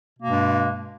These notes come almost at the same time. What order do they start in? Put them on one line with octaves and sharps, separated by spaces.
B2 A#3 G#3 G2